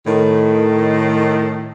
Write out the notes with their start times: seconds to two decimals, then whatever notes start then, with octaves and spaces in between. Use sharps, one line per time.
0.07 A2 D#3